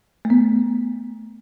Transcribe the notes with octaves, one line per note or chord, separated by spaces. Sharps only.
A3
B3